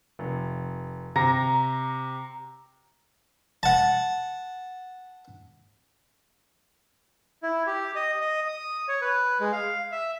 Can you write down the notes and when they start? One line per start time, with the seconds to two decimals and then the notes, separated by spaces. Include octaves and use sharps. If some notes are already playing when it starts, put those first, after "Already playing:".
0.19 F1
1.16 C3 A#5
3.63 F#5 A5
7.43 E4
7.67 G4
7.96 D#5
8.21 D#5
8.48 D#6
8.88 C#5
9.02 B4
9.40 G#3
9.52 F5
9.92 E5